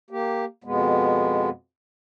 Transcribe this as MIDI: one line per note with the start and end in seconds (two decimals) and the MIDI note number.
0.10 0.45 58
0.10 0.45 67
0.64 1.49 41
0.64 1.49 47
0.64 1.49 56
0.64 1.49 59